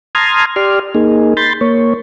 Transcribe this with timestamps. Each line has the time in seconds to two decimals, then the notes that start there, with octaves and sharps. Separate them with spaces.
0.15 A5 A#5 C6 D#6 F6 G#6
0.56 G4 D5 C6 F6
0.95 A#3 D#4 G#4
1.37 B5 C6 G6 A6
1.61 A#3 C#5